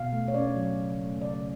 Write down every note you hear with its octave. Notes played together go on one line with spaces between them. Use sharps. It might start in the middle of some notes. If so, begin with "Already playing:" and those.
Already playing: B2 F5
A3
C#5
C#4 D5
F#3
C#3
A3
C#3 D5